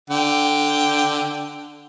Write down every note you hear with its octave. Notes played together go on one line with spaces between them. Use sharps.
D3 G5